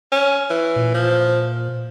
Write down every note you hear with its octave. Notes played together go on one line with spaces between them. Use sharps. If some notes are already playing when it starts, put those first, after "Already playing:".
C#4
E3
A#2
F3